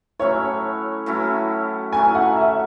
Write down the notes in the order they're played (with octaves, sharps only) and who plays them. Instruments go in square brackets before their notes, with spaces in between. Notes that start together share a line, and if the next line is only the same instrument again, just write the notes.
[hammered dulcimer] A2 F#3 C#4 E4 [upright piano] C#5
[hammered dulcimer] A2 F#3 C#4 E4
[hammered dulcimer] A2 F#3 C#4 E4 [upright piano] G#5
[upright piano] F#5
E5